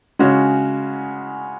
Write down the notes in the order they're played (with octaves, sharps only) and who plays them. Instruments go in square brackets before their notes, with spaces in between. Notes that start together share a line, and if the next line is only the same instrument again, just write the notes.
[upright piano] C#3 G#3 C#4 F#4